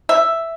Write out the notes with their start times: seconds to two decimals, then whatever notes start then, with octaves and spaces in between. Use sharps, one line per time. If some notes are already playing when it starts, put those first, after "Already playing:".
0.09 E5